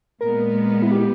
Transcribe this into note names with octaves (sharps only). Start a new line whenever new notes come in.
A#2 G#3 B3 A#4
E4
G4